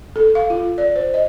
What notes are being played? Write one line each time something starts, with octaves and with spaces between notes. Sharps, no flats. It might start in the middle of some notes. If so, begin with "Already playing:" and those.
A4
F5
F4
D5
C5
D#5